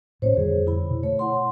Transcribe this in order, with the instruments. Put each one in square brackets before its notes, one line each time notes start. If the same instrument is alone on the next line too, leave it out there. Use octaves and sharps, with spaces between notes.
[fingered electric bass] A2 B3 C#4 [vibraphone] C5 C#5
[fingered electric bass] F2 D3 G3 [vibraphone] G#4
[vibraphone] E4 B5
[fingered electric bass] B2
[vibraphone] A3 C#5
E4 F#5 C6